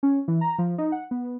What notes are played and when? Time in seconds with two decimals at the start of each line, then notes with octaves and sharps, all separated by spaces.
0.03 C#4
0.28 E3
0.41 A#5
0.58 F3
0.78 D#4
0.92 F#5
1.11 B3